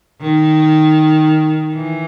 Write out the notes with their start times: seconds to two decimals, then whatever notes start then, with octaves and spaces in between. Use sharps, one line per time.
0.21 D#3
1.75 E3